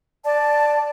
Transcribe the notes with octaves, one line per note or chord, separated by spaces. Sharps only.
D5 A5